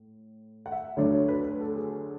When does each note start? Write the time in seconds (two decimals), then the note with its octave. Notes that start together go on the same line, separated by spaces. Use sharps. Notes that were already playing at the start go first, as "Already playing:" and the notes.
Already playing: A2
0.66 F#5
0.72 E5
0.96 D2 D3 F#3 A3 D4 C#5
1.12 C#5
1.28 B4
1.44 B4
1.60 A4
1.76 G#4